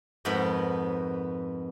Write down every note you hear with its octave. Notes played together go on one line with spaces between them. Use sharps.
F2 G#2 B3 A#4 B5